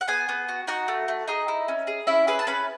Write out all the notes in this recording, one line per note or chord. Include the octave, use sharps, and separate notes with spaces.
F#5
B3 G#4 G#5
B3
F#4
D#4 F#4 F#5
A3
A3
D#4 G#4 D#5
E4
C#4
G#4
C#4 E4 E5
G#4 B4 B5
A5
C#4 B4 B5